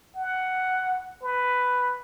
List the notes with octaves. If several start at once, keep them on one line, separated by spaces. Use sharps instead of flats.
F#5
B4